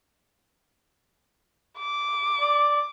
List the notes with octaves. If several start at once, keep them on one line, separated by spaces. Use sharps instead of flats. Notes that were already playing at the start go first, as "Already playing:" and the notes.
D6
D5